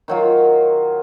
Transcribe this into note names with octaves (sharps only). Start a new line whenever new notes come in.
D#3 F#3 F4